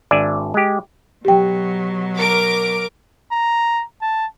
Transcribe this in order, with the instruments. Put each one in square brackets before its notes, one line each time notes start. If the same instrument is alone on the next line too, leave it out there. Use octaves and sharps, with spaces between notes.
[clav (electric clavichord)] G#1 D4 D5 E5 G#5
G#3 G4
[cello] B2 F#3 [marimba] G4 G5
[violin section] A#4 D6 D7
[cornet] A#5
A5